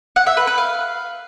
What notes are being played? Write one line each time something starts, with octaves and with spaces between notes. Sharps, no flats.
F#5
E5
B4
B4
F5